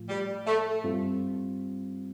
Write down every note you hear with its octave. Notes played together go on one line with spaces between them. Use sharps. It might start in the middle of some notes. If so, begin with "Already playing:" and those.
Already playing: A2 F3 A3 F4
G3
A3
G2 G3 C4 F4